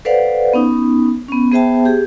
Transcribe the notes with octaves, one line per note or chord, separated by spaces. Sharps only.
A4 B4 C5 D5 F5 F#5
B3 C#4 D#4
B3 C#4
B3 G#4 C5 E5 G5 A5
G4 G#4